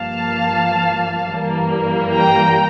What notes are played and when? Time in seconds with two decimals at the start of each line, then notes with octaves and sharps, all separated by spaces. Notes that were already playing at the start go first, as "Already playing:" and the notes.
Already playing: G2 F3 A#3 F5 A5
1.35 G2 E3 G3 A#3
2.13 G5 A#5